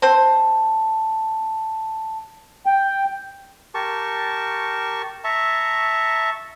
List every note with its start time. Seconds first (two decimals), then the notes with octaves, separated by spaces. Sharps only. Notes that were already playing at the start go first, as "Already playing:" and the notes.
0.02 C4 C5 A5
2.66 G5
3.74 G4 A#4 A5 C#6
5.24 E5 A5 A#5 C#6